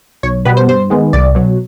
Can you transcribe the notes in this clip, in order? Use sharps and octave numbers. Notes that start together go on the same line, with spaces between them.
B1 C#5
B2 G3 B3 B4
C5
G2 C5
D#3 G#3 B3
C2 D5
B2 F#3